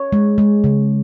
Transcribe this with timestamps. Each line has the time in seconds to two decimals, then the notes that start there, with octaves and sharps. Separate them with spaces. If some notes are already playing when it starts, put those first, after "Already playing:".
Already playing: C#5
0.13 G#3
0.38 G#3
0.64 C#3